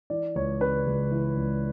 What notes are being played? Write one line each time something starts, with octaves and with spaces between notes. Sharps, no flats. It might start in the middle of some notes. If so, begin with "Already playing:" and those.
E3 D5
C#2 C#5
C#3 B4
C#2
E3
C#2